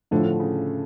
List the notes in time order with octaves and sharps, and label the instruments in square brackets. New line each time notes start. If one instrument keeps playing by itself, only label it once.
[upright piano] A2 F3 A3 [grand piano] D3
[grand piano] D3
C#3